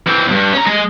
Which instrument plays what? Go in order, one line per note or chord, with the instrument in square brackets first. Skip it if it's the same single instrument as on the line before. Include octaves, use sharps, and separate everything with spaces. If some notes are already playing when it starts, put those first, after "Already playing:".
[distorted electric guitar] E3 C4
E2 G2
C#4 A#5
G#3 D#5